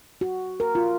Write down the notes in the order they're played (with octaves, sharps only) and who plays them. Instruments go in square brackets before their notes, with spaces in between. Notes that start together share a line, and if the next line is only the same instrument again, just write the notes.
[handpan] F#4
A#4
F4